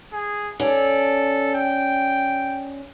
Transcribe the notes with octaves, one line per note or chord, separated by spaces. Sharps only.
G#4
C#4 A4 D5
G5